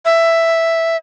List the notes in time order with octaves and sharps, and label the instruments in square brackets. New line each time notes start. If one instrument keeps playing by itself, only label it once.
[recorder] E5